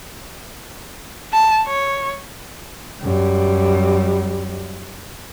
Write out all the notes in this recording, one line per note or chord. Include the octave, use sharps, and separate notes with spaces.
A5
C#5
F#2 G3